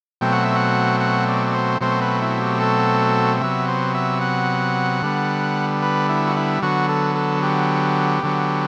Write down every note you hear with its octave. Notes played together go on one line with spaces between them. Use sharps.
B2 F#3 A3 C4 G5
F#5
E5
F#5
F#5
D5
D5
C5
B2 F#3 A3 C4 C5
B4
E4
G4
A4
C3 F#3 B3 E5
C5
E5
F#5
D3 G3 B3
B4
E4
F#4
E4
D3 F#3 B3 F#4
A4
A4
G4
D3 F#3 B3